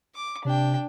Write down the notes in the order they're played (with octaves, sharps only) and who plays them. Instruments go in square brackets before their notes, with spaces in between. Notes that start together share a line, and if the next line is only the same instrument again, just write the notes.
[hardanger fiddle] D6
[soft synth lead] C3 [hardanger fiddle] D4 G5